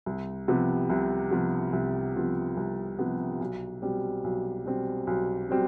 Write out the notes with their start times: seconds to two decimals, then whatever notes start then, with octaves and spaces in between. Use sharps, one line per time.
0.06 C2
0.48 C3 F3 B3
0.90 C2
1.31 C3 F3 B3
1.73 C2
2.16 C3 F3 B3
2.57 C2
2.99 C3 F3 B3
3.41 B1
3.82 B2 G3 C4
4.24 B1
4.65 B2 G3 C4
5.07 B1
5.49 B2 G3 C4